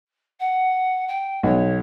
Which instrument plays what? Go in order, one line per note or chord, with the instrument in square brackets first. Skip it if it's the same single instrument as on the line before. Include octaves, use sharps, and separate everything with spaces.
[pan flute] F#5
G5
[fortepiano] B1 [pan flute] C#5